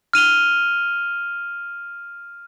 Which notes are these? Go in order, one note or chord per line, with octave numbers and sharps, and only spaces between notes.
F6 D#7 F7 G7